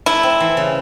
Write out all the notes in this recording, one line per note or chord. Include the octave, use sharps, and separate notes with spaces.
A3 E4
C4
E3
C#3